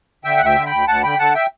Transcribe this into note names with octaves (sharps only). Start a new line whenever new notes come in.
D3 E5 G5
D2 F#5
E5 G5
D3
G5 B5
D2
D2 F#5 A5
D3 G5 B5
D3 F#5 A5
E5 G5